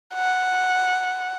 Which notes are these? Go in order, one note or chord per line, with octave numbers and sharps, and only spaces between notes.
F#5